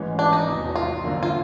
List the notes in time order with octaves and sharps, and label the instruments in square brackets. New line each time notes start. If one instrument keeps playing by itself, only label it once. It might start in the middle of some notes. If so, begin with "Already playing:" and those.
Already playing: [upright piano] A1 G#2 E3 G#3 C#4
[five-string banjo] D4
D#4
[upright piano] F1 E2 B2
[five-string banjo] F4
[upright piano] G#1 F#2 D3 F3 A#3
[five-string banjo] F4